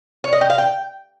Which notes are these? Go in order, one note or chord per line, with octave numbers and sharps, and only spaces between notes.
C#5
D#5
G4
F5
G5